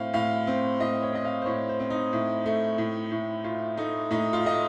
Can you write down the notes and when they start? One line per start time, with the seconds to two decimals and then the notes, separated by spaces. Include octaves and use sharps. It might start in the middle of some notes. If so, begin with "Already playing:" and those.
Already playing: A2 C4 F5
0.13 A2 F5
0.47 C4
0.80 A2 D#5
1.02 C#5
1.13 C4 D#5
1.25 F5
1.42 C5
1.46 A2 C#5
1.69 C5
1.80 C4
1.90 D#4
2.13 A2
2.46 A3
2.78 A2
3.12 A2
3.44 A2 F4
3.77 A3 D#4
4.11 A2 D#4
4.33 F4
4.44 A3 D#5